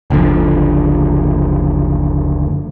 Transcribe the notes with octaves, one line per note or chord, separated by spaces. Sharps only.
F#1 D2 D3 F3